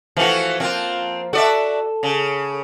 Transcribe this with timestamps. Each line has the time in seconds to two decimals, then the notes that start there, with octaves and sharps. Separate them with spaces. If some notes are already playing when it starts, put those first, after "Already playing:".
0.17 E3 F3 A3 F#4
0.60 F3 A#3 C4 F4
1.33 F#4 A4 D5 E5
2.03 C#3